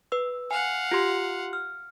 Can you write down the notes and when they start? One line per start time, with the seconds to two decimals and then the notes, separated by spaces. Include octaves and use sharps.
0.12 B4 E6
0.51 F5 F#5 G#5
0.91 F4 G4 C6
1.53 F6